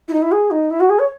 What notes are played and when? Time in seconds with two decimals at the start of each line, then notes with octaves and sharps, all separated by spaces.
0.08 E4
0.13 D#4
0.22 E4
0.32 G#4
0.51 D#4
0.71 E4
0.80 F#4
0.90 G#4
0.99 C#5